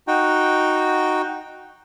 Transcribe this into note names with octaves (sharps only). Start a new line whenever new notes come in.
D#4 F#4 G5